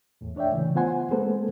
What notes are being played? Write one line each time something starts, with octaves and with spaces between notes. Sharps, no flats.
E2 A2
D4 C#5 D5 E5 G5
C#3 E3 A3
B3 F4 C5 F#5 G#5 C6
G#3 A#3 C4 A4 B4 C5